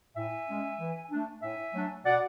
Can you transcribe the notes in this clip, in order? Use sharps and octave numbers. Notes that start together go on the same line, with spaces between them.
A2 E5 G#5
G#3 C#4
E3
A3 D4
A2 E5 G#5
F#3 A3 D4
B2 D5 F#5